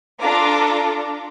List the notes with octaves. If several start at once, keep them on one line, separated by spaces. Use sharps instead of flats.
D4 F4 A4 A#5 D6